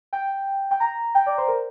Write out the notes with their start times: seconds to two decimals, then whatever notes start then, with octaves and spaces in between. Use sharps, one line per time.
0.13 G5
0.71 G5
0.80 A#5
1.15 G5
1.26 D5
1.38 C5
1.48 A#4